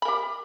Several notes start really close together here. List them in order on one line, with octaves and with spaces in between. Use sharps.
B5 A#4 G4